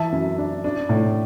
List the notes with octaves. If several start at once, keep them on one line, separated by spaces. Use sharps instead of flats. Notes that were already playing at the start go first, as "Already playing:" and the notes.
Already playing: E3 E5 A5
F#2
D4
D4
A2